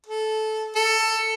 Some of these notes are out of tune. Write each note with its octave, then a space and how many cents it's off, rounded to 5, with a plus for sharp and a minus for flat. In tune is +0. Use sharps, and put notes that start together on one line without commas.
A4 -15
A4 +15